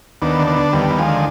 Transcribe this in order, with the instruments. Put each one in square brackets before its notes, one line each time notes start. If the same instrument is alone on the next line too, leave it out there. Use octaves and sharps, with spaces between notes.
[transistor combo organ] D#2 B3 D4
D3
B3 D4
D3
D#2 G3 B3
D#2
F3 G#3
D3